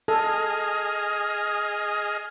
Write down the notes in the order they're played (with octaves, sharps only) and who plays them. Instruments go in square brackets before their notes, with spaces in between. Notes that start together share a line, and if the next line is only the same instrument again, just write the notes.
[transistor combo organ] G#4 D#5 F6 [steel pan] A4